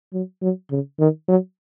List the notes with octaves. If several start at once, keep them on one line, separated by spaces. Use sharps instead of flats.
F#3
F#3
C#3
D#3
F#3